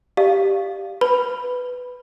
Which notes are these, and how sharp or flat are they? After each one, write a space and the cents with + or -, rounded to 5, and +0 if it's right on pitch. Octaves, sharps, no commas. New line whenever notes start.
G4 +0 D5 +35 F5 +0
B4 +10 B5 +0